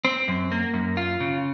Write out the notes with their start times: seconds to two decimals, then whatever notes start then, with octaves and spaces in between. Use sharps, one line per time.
0.05 C4
0.28 F#2
0.52 A#3
0.74 F#2
0.97 F4
1.20 C#3